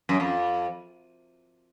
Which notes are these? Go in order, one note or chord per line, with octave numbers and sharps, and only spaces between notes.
F#2
F2